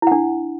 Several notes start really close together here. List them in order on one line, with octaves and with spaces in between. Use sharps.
E4 F#5 D4